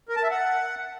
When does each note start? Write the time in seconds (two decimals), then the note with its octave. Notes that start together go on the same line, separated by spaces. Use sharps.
0.09 A#4
0.16 A5
0.24 E5
0.31 F#5